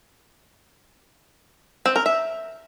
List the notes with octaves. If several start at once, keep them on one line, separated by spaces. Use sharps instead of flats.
C4
A#4
E5